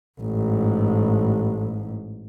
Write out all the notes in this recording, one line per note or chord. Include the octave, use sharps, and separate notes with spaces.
A1 G#2